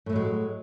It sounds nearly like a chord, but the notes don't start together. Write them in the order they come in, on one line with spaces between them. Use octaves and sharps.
A2 A3 F#3 G#3